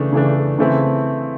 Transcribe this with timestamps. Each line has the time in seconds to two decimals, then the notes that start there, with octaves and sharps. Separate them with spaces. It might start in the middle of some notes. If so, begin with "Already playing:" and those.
Already playing: C#3 E3 A3 D4
0.13 C#3 E3 A3 D4
0.59 C#3 E3 A3 C4 E4